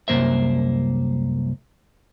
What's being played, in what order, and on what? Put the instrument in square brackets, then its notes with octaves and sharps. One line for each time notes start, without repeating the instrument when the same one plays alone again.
[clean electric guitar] C2 F#2 C#3 A#3 C5 E5